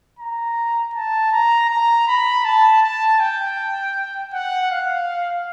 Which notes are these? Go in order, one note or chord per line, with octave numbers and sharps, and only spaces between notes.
A#5
A5
A#5
A#5
B5
A5
A5
G5
F#5
F5